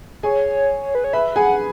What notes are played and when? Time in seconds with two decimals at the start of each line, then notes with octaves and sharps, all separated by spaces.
0.23 G#4 C#5 G#5
0.95 B4
1.04 C#5
1.13 B4 E5 B5
1.35 G#4 F#5 G#5